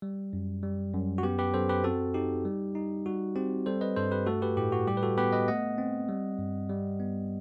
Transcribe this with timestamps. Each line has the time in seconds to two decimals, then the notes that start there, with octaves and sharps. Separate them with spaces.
0.02 G3
0.33 F#2
0.63 G3
0.94 F#2
1.18 F#4
1.23 B3 G4
1.39 G4 B4
1.54 F#2 A4 C5
1.69 G4 B4
1.84 C4 F#4 A4
2.14 D#4 G4
2.45 G3
2.75 D#4
3.06 G3 F#4
3.36 C4 G4
3.66 G3 A4 C5
3.81 B4 D#5
3.96 G2 A4 C5
4.11 G4 B4
4.26 A3 F#4 A4
4.42 G4 B4
4.57 A2 G4
4.72 F#4
4.88 G3 G4
4.97 B4
5.03 F#4 A4
5.18 B3 G4 B4
5.33 B4 D#5
5.48 A3 D#5 F#5
5.78 C4
6.09 G3
6.39 G2
6.69 G3
7.00 B3